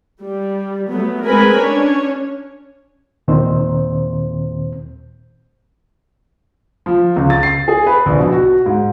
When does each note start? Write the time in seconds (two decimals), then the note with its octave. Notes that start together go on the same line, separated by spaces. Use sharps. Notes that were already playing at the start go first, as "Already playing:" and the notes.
0.22 G3
0.91 F#3 A3 B3
1.23 G#3 C4 A#4 B4 G#5 B5
1.57 C#4 D4 C#5
3.28 D#2 A#2 D#3 C4 C5
6.86 F3
7.16 C#2
7.30 A6
7.43 C7
7.68 G#4
7.87 B4
8.06 A#1
8.19 B2
8.33 F#4
8.66 G#2